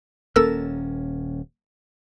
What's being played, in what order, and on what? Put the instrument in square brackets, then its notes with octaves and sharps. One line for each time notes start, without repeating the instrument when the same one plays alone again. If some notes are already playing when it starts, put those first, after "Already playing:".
[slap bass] D#1 A#3 C#4 [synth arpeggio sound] A4 A#4 E6